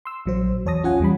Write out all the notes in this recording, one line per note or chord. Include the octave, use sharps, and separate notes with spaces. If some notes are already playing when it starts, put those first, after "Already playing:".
C6 E6
A#1 F#3 C5
E2 C#5 A5 D#6 A#6
C#4 F4 C#5 F#5 G#5
E2 G3 B5